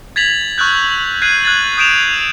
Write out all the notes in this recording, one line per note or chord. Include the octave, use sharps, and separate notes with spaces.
G#6 A6 B6 F7 F#7
C#6 E6 F#6 G6
F#6 G#6 C7 D#7
F#6 G#6 A6 F#7
D#6 G6 D7 E7 F7